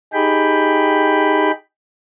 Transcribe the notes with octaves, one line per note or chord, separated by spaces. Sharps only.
D#4 G4 G#4 G5 B5